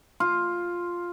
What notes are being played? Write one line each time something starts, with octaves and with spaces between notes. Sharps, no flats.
F4